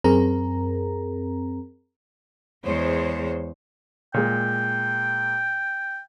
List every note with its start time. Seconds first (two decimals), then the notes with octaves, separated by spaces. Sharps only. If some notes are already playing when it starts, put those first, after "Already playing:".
0.04 F#2 C4 G#4 A#4 A#5
2.64 E2 G#3 C5 C#5
4.14 A#2 G#3 G5